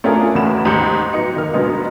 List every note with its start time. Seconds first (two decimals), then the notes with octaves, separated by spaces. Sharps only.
0.04 A3 C#4 D4 F4 G#4 A#4
0.35 A1 E2 A3 F#4 B5 E7
0.65 D#2 G#2 G4 G6 C#7
1.13 F#3 B3 D#4 C#7
1.36 D#3 A#3 F6
1.54 G#2 B2 D3 G#3 B3 D#4